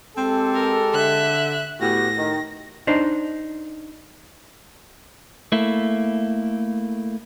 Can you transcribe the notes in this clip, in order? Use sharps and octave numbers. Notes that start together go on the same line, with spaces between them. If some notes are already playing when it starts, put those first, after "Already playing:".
G#3 C4 G4 A4
A#4
D3 E5 F#6
A2 B3 F#4 G4 A#6
D#3
D4 D#4 C5
A3 A#3 E4